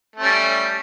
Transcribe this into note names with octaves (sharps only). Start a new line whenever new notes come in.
G3 A3 C#4